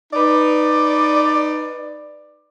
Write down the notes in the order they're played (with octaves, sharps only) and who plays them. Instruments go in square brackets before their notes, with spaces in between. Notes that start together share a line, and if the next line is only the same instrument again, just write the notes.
[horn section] D#4 B4 D5